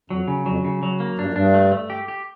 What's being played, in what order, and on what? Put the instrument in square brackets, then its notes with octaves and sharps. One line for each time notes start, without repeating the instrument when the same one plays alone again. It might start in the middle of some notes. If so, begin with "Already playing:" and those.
[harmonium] F2 [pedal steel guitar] F#3
[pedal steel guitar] C#3
[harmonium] F2 [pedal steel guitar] F#3
[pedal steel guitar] C#3
F#3
A#3
[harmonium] G2 [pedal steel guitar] D4
[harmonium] F#2
[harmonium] G2 [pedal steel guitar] D4
[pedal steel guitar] A3
A3
G4
G4